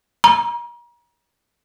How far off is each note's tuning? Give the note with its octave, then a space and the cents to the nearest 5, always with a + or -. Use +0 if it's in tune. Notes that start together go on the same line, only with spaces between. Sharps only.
A#5 +35